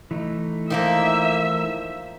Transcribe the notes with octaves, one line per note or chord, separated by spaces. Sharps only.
E3 A3 D#4
D#3 F3 A#3 E5